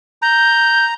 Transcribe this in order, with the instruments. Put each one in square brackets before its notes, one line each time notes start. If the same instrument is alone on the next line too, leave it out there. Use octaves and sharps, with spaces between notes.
[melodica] A#5 [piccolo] G6